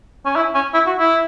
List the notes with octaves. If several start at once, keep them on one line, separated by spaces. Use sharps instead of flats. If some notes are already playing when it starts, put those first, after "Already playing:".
C#4
E4
C#4
E4
F#4
E4